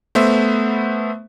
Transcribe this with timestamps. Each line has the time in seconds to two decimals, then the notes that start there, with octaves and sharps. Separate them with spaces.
0.15 A3 B3 C5 E5